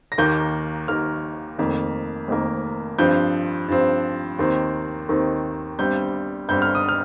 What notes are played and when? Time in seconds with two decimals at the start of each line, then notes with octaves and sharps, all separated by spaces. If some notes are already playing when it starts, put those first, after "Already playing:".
0.12 A#6
0.18 D#2 D#3 A#3 G6
0.88 D#2 D#3 A#3 F6
1.58 F1 F2 D#3 A#3
2.28 F1 F2 D#3 A#3
2.98 G2 F3 C4 G6
3.68 G2 F3 C4
4.39 D#2 D#3 C4
5.09 D#2 D#3 C4
5.79 G1 G2 G3 C4 G6
6.49 G1 G2 G3 C4 G6
6.62 F6
6.75 D#6
6.89 F6